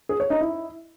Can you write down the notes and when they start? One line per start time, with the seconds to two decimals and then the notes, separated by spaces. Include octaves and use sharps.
0.09 G#4
0.20 C#5
0.30 D#4
0.41 E4